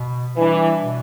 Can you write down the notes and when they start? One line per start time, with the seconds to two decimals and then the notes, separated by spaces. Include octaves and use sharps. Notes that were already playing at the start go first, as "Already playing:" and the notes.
Already playing: B2
0.37 E3 G3 D4
0.83 B2